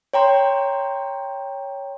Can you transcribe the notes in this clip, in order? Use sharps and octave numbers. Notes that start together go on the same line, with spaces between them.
C#5 G5 A#5 C6